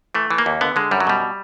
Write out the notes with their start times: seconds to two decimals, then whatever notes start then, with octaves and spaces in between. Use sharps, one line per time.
0.15 E3 A3
0.31 E3
0.38 A#3
0.46 D#2
0.61 D3 B3
0.76 D3 G#3
0.91 F#2 G3
1.00 F#3
1.07 B2 G3